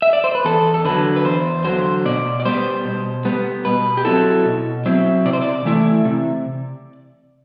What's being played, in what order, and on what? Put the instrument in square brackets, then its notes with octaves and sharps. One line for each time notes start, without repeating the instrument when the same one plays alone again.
[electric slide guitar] E5
D5
C5
B4
E2 A4
A4
D3 F#3 B4
B4
E2 C5
D3 F#3 C5
B2 D5
D5
G3 B3 C5
B2
G3 B3
B2 B4
G4
F#3 C4 E4 A4
B2
F#3 C4 E4
C3 D5
C5
D5
E3 A3 E4
C3